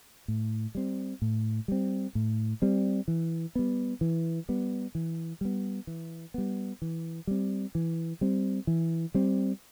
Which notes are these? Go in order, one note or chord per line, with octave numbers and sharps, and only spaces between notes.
A2
G3 C4
A2
G3 C4
A2
G3 C4
E3
G3 B3
E3
G3 B3
E3
G3 B3
E3
G3 B3
E3
G3 C4
E3
G3 C4
E3
G3 C4